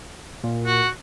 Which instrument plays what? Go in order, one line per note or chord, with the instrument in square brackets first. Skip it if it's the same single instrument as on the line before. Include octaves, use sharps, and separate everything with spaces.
[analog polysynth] A#2
[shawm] F#4